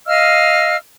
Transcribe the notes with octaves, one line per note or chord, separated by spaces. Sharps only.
D#5 F5 E6 F6